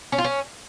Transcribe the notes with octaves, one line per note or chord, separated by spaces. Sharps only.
C#4
F4
C#4